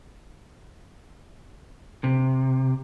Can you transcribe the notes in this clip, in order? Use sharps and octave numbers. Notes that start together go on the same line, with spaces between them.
C3